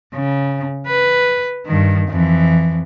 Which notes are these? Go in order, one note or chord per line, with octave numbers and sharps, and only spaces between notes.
C#3
B4
G2 D#3
F2 E3